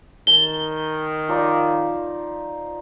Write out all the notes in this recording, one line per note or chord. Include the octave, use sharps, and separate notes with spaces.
D#3 A5 G7
F3 D#4 D5